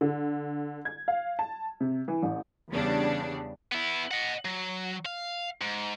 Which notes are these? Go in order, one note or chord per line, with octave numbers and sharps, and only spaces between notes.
D3
G#6
F5
A5
C3
E3
A1
E2 C#3 G3 B3 D4
B3 E4
D#5 F#5
F#3
F5
G#2